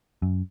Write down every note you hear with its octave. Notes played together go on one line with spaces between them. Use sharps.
F#2